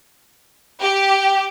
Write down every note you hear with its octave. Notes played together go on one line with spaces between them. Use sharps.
G4